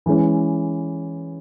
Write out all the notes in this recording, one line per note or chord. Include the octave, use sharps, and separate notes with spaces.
E3 G#3 C#4